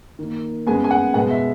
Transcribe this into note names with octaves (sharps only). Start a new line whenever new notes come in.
D#3 A#3
C#3 G#3 B3 G#5
G#5
F#5
B2 G#3 B3 F#5
E5